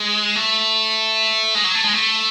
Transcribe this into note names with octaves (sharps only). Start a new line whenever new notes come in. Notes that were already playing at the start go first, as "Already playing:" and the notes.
Already playing: G#3
A3
G#3
F#3
A3
G#3
A3